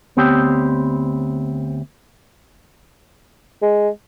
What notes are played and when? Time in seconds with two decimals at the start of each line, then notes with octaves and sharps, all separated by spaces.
0.17 D2 B3 C4 G4 C#5 G5
3.62 G#3